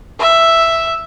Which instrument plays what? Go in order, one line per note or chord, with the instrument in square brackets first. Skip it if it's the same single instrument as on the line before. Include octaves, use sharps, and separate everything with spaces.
[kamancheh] E5